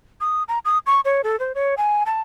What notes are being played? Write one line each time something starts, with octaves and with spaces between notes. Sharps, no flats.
D#6
A#5
D#6
C#6
C#5
A4
C5
C#5
G#5
A5